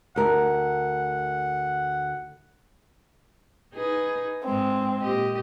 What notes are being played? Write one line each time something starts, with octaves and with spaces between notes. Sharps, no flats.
D2 A#4 F#5
D#4 G#4 B4
G#2 G#3 C4
A#2 G4 D#5